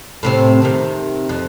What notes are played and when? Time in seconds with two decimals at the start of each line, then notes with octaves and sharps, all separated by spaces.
0.23 A2 C3 C4
0.62 C3 D#3
1.29 F2